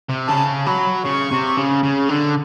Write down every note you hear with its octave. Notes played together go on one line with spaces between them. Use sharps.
C3
C#3 A5
F#3 B5
C#3 C#6
C3
C#3
C#3
D3